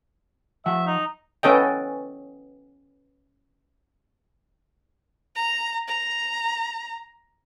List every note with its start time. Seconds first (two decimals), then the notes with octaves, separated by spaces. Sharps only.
0.66 F3 E5 F#5
0.87 D#4
1.43 B3 C#4 A4 D#5 G5
5.35 A#5
5.87 A#5